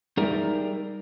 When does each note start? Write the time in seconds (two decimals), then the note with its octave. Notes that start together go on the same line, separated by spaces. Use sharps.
0.17 G3 D#4 G#4 A#4 D5 E5